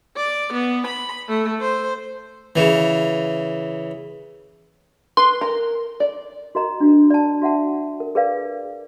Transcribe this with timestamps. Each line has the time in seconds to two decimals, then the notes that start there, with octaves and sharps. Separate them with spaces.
0.17 D5
0.53 B3
0.87 B5
1.29 A3
1.61 C5
2.56 C#3 E3
5.17 B4 C6
5.41 A#4
6.00 D5
6.55 F#4 A#4 D#5 A#5
6.80 D4 F#4
7.10 D5 A5
7.42 F#4 E5 F#5 A5
8.00 A#4
8.15 G#4 A#4 B4 D5 F5